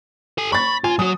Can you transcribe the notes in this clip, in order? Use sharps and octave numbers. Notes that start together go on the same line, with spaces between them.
A4 G#5
B5 C#6 A6
F4 G#5
F#3 F#4 D#6